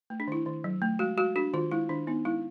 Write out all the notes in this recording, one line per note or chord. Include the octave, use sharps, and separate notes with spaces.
A3
D4
D#3 E4
D#3
F#3
A3
G#3 F#4
G#3 F#4
D4 F#4
D#3 F4
G#3 E4
D#3 D4
B3 D#4
G#3 E4